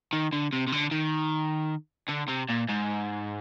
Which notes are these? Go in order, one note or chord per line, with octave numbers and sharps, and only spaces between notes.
D#3
D3
C3
C3
D3
D#3
D3
C3
A#2
G#2